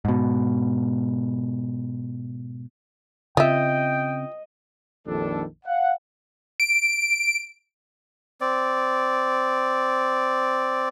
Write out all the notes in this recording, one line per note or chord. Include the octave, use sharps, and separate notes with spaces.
G#2 B2
C#3 C4 F4 D#5 E5 G5
A#1 F2 D#3 G3 D4 A4
F5 F#5
D7
C4 D5